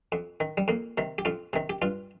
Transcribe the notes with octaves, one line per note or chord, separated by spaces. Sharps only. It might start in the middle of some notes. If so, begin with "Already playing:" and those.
F2
D#3
G3
F2 A#3
C3 D#3
G4
F2 F4
C3 D#3
G4
G2 F4